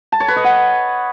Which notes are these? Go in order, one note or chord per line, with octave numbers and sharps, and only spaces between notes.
A5
C#5
B4
D#5
F#5